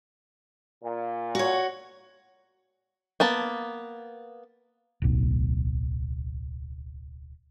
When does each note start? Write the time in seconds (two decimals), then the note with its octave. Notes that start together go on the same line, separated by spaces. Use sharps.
0.84 A#2
1.35 F#4 C#5
3.20 A#3 B3 A5
5.02 D1 B1